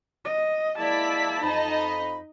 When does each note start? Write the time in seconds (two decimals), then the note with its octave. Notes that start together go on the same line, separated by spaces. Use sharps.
0.25 D#5
0.78 G#3 A#3 E4 D5 A5 B6
1.42 F2 D#4 D#5 B5